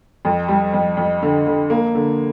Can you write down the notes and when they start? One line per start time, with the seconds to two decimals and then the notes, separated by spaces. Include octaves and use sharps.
0.25 F2
0.49 G3
0.74 F2
0.97 F2
1.22 D3
1.47 D3
1.70 A#3
1.95 D3